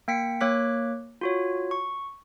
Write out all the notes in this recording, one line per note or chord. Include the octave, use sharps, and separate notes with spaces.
A#3 G5 B6 C#7
A#3 C#5 D6 F#6 B6
F4 F#4 C#5
C#6